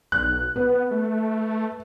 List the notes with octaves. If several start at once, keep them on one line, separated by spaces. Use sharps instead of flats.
B1 F#6
B3 B4
A3